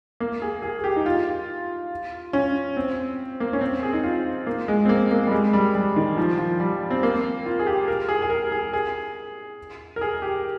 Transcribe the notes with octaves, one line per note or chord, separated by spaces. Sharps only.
A#3
G#4
G#4
G#4
G4
D#4
F4
C#4
C4
A#3
C#4
C4
G#4
D#4
F4
A#3
G#3
C4
A#3
A#3
G3
G#3
G3
G3
D#3
F3
F3
G3
C4
A#3
F4
G#4
G4
A#4
G#4
G#4
A#4
G#4
G#4
A#4
G#4
G4